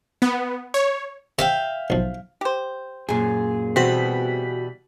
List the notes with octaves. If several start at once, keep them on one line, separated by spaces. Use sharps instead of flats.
B3
C#5
C3 E5 F5 G5
B1 F3
G4 C5
F#2 A#2 G#4
B2 E3 G3 C4 F#4 B6